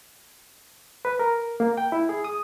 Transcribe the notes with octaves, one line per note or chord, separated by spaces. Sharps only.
B4
A#4
A#3
G5
E4
G#4
D#6